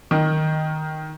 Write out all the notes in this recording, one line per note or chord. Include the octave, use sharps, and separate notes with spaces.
D#3